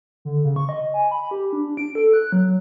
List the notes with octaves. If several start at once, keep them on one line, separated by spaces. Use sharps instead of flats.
D3
C#3
C#6
D#5
G#5
B5
G4
D4
D7
A4
F#6
F#3